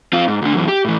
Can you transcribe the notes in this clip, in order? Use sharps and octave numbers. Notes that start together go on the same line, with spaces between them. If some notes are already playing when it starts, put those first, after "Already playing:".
C4 F4
G#2
D2 D3
F#2 E3
G4
A2 E3